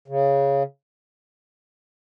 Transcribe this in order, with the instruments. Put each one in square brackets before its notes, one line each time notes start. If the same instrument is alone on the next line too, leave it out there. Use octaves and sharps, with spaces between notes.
[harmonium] C#3